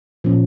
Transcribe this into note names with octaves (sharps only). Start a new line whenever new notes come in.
A#2 F3 A#3 C#4